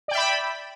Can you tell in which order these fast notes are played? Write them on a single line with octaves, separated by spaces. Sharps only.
D5 G5 E5 B5